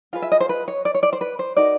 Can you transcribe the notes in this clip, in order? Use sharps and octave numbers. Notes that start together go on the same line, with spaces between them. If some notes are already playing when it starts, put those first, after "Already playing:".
F4 G#4 B4 F5
E5
D#5
C5
B4
C#5
D5
C#5
D5
C5
B4
C5
D#4 F#4 A#4 D5